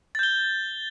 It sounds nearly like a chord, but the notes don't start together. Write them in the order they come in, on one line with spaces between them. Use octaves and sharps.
A6 G6 G7